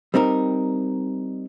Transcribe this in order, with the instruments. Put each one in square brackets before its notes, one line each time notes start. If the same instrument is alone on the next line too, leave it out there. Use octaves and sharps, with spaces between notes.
[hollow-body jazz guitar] G3 C4 D#4 A#4